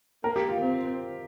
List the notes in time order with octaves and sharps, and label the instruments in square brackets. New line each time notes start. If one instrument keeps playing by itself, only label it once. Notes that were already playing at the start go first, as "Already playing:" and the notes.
[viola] A#3 [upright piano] A#4
[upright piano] G4
F4
[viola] C4